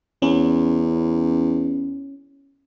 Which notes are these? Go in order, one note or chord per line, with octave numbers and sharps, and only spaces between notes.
E2 C#4